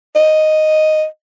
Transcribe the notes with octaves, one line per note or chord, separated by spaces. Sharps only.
D#5